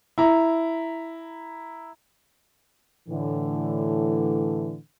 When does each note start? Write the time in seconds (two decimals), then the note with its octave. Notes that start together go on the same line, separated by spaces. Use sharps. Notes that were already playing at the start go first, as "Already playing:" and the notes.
0.18 E4 A#5
3.09 A2 D3 E3